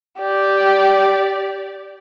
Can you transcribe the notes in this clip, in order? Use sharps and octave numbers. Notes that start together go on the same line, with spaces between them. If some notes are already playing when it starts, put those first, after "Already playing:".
G4 D5